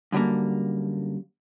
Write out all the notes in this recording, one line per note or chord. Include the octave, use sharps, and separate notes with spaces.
F#2 D3 F#3 G3 A#3